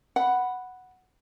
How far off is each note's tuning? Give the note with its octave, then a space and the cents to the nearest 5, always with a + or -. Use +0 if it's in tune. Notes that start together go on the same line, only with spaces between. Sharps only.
F#5 +0 B5 +0